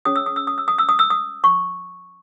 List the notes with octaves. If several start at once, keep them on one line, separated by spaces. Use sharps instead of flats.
C#4 G#4 C#5 D#6
E6
D#6
E6
D#6
E6
D#6
E6
D#6
E6
D#6
C#6